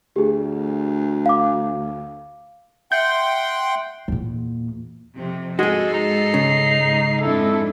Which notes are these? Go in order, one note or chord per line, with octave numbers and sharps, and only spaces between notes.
D2 G4 G#4
F5 D6
E5 F#5 G5 C6 G6
E2 A#2
F2 C3
G#2 G#3 F#4 G#4 A4
D#4 C7
C#3
G#2
F2 G#2 D4 E4 A4